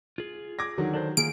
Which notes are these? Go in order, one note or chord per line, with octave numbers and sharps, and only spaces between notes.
F4 G#4
D6 G#6 A#6
D3 D#3 F#3
D4 A4 C5
D#3 A#3 F4 G#4 D7